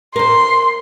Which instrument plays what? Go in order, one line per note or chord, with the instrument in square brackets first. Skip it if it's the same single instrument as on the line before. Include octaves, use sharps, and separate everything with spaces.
[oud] A#4 C5 [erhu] C6